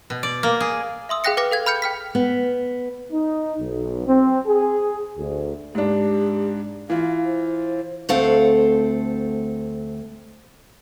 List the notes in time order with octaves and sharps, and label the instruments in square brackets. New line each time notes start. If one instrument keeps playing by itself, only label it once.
[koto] B2
D5
A#3
G#4
[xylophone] E5 C6 D#6 E6
G#4 F5 G5 F#6 A#6 C#7
B4 G5 D6 F6 A#6 G7
A4 F5 G#6
B5 F6 G6 C#7
G5 F6 B6
[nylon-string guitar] B3
[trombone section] D#4
B1
C4
G#4
D2
[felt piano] G#2 D4 [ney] G4
[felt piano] E3 F4 [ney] F5
[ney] C5
[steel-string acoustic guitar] D2 A3 C4 A4 F5 F#5